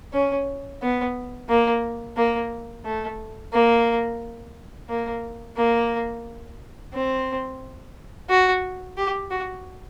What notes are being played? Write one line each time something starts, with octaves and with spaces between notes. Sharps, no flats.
C#4
B3
A#3
A#3
A3
A#3
A#3
A#3
C4
F#4
G4
F#4